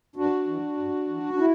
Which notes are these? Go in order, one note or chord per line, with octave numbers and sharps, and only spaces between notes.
G2 D4 F#4
E3
G2
E3
D4
E4